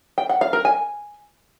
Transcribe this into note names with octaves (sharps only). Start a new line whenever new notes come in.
G5
F#5
F5
A#4
G#5